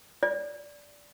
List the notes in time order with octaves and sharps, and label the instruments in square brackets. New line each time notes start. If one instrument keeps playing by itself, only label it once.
[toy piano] D5